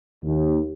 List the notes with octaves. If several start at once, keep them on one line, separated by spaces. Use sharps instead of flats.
D#2